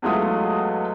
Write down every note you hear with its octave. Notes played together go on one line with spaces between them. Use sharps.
E2 F#3 G#3 A3 F4 D#6